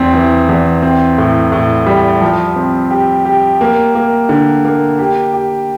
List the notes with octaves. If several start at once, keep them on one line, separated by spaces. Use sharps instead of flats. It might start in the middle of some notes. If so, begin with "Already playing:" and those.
Already playing: E2 C4
E3
E2
C4
A2
A2
G3
F3
C4
G4
G4
A#3
A#3
D3
A#3
G4
G4